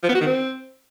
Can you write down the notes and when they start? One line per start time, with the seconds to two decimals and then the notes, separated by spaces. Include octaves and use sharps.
0.03 F3
0.09 B3
0.15 F#4
0.21 D#3
0.27 C4